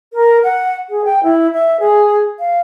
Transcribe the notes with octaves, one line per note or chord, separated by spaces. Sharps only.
A#4
F#5
G#4
G5
E4
E5
G#4
F5